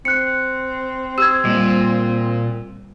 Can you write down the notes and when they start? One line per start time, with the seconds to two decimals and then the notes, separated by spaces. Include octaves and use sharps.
0.05 C4 F#6 C#7
1.18 G4 E6 G#6
1.45 A#2 G3